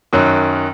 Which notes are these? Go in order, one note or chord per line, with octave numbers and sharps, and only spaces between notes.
F#2 D#3 F#3